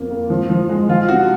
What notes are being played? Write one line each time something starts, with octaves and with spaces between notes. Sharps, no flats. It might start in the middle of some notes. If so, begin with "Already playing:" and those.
Already playing: F2 A#3
A#3
F3
F3
G#3
F3 F4
C3 F#4